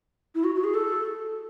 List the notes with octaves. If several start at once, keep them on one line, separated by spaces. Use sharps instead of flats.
E4
F#4
F#4
G#4
A4